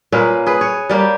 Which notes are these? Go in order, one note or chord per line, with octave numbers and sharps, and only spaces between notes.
A#2 A#3 C#4 B4
G#4 B4
C#5
G3 A#3 G4